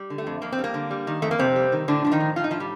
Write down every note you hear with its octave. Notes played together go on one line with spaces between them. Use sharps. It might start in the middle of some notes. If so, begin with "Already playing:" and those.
Already playing: G3
D3
A3
F2
F2 A#3
C4
G3
A#3
D3
G3
D#3
F2 A3
A#3
F2 C3 C4
G3
D#3
A2 D3 D4
F3 D4
D#3 D#4
A2
F3 F4
D#4
A2 F3 F4
G3